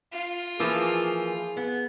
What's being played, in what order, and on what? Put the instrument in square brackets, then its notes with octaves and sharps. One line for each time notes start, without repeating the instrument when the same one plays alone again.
[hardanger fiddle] F4
[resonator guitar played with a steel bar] E3 F3 A#3 [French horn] G#4
[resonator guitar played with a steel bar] B3